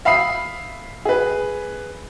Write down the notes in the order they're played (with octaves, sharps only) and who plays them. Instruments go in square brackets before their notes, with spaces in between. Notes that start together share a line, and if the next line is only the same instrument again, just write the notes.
[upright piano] E5 F5 B5 D#6 C7
G#4 B4